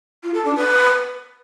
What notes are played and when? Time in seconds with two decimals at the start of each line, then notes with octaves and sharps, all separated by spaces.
0.23 F4
0.34 A4
0.44 D4
0.55 B4